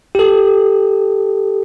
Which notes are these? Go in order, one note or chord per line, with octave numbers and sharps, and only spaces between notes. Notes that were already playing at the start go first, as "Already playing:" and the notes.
G4 A4